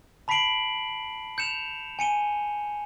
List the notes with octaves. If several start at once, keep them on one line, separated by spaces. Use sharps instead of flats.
A5 B5 B6 C7 D7 F#7
G6 C#7 E7 F7
G#5 C#7 D#7 G7